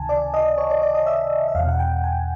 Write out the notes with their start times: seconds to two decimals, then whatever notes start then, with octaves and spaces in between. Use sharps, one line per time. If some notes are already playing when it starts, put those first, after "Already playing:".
Already playing: C#2 C3 D#3 G#5 A5
0.09 D5
0.34 D#5
0.58 C#5
0.70 D5
0.82 D5
0.94 D#5
1.06 E5
1.48 E5
1.55 E2 F5
1.59 B2
1.68 F#5
1.79 G5
2.04 G#5